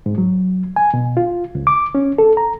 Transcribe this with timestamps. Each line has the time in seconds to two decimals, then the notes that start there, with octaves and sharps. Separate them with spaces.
0.06 G#2
0.18 F#3
0.76 G#5
0.94 B2
1.17 F4
1.55 C#2
1.67 D6
1.95 C#4
2.18 A4
2.37 A#5